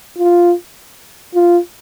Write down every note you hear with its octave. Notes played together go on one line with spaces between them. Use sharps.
F4
F4